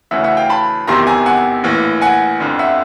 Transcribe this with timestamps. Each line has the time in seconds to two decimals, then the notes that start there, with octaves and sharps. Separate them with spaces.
0.11 D2 C#3 E3 E5 F#5
0.24 E5 F#5
0.37 F5 G5
0.49 A5 B5
0.87 E1 E2 C3 D#3 A#5 C6
1.07 G#5 A#5
1.26 F#5 G#5
1.64 A#1 A2 E3
2.02 F#5 G#5
2.40 G1 F2 D3
2.59 E5 F#5